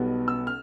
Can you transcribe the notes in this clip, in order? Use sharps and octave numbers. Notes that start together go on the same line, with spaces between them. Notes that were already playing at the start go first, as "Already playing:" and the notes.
Already playing: B1 B2 G3 B3
E6
F6